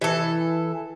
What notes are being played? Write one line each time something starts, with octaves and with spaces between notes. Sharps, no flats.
E3 A4